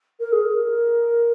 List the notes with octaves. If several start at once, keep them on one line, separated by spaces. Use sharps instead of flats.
A#4
G#4
A#4